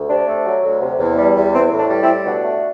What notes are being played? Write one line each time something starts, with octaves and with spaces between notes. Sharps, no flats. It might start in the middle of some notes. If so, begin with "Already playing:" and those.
Already playing: D2
C3 D4
A3
F#3
D2
C3
E2
G3
E2
E3 C4
A2
D4
G3
C4 E4
A2
B2 D4 F#4
A3